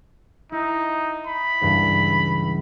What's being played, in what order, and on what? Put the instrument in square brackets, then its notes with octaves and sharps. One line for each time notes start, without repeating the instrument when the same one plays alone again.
[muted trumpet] D#4 [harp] E4
[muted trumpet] B5
[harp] C#2 G2 E3